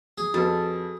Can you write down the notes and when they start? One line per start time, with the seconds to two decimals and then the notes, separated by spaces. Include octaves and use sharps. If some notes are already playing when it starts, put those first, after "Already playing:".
0.18 G#4
0.34 F2 F#4 A4 B4